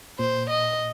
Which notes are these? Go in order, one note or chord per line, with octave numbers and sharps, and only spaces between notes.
A#2 C5
D#5